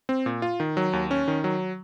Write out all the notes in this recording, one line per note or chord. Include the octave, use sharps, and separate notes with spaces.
C4
A#2
F4
D#3
F#3
D#2
C#4
D#3
F#3